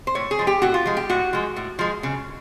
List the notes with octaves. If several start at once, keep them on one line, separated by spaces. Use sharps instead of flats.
C5
A2 C#5
G#4
F3 G#3
G4
A2 F#4
F4
F3 G#3
G4
A2 F#4
F3 G#3
A2
F3 G#3
C#3